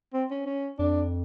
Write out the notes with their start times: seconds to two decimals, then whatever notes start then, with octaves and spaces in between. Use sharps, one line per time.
0.13 C4
0.30 C#4
0.46 C#4
0.79 F2 D4